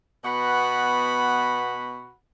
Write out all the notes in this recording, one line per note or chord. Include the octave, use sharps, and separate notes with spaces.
B2 B3 F#4 F#5 B5